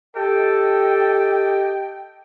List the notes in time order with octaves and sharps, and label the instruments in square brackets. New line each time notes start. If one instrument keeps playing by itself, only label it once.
[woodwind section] G4 D#5 G5 [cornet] A4